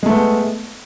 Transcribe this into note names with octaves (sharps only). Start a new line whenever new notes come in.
G#3 A3 B3